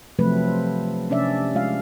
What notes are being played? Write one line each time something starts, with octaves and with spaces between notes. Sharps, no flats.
C3 F3 F#3 A3 C4 B4
C5
C3 C#4 D4 D5 E5
G#3 F4 F5